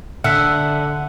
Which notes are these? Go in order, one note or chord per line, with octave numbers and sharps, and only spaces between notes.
D3 E5 F#5